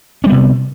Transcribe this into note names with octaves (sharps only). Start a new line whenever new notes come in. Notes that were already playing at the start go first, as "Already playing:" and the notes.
C3 G3 B3 C#4